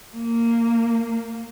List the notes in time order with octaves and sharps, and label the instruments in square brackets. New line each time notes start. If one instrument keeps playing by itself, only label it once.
[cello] A#3